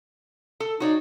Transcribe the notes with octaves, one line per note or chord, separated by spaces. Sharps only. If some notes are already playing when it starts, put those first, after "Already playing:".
A4
D#4 F#4 C#5 D5